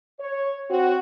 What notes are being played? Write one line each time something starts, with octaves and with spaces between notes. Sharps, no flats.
C#5
C4 F#4